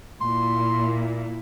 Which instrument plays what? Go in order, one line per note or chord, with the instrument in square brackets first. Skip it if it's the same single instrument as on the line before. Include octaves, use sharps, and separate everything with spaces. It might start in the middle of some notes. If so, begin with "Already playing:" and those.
[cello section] A#2 E4 [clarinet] C6